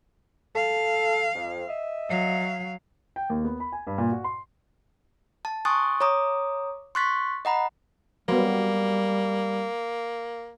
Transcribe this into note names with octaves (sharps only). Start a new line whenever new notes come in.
A4 F5
F2
D#5 E5
F#3 F5
G5
D#2
B3
B5
G#5
G2
A#2
F#4
C6
A5
G#5 C6 C#6 D#6 F#6 A6
C#5 A#5 D6 D#6
C6 C#6 F#6 A6 B6
D#5 F#5 A#5 B5
F#3 G3 A#3 B3